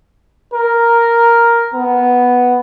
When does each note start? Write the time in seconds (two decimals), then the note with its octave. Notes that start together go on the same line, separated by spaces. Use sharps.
0.53 A#4
1.74 B3